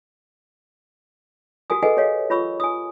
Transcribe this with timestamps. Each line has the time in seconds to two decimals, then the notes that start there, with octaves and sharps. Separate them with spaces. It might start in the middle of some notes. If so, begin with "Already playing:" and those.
1.70 F#4 G4 A#4 G#5 D#6
1.83 G#4 A4 B4 D#5 F#5 G#5
1.97 G4 A#4 C#5 D#5 F5
2.30 F4 C#5 B5 C#6 E6
2.60 G#5 D#6